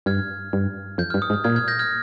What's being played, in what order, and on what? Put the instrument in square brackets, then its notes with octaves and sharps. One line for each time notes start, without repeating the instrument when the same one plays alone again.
[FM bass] G2 [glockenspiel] F6 G#6
[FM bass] G2
[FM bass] F2 [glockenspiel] G6
[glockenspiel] F6
[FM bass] G2
[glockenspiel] D#6
[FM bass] G#2
[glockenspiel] F6
[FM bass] A#2 [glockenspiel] F6 G#6
[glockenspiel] F6 G#6
G6 A#6
F6 G#6